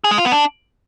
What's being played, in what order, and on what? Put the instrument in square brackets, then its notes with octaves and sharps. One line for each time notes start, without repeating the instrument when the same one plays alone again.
[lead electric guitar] G#4
G#3
F4
B3
D4